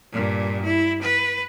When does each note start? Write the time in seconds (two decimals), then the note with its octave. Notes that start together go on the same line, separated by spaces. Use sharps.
0.13 G2 A#2
0.65 E4
1.02 B4